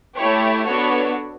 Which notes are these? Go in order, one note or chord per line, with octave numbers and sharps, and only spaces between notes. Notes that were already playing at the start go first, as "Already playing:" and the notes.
A3 E4 G4 C#5
B3 D4 F#4 A4 C#5